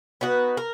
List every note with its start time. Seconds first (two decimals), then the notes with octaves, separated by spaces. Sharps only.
0.21 B3 D#4 F#4 B4
0.57 A#4